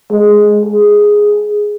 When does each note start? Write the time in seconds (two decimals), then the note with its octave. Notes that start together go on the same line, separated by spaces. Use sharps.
0.11 G#3
0.65 G#4